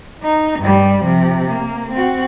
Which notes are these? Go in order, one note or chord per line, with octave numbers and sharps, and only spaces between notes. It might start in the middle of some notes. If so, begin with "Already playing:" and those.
D#4
G2 G3
C3 F3
A#3
C4 F#4